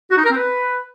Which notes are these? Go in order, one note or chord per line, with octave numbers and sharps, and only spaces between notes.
F#4
D#4
A#4
C4
B4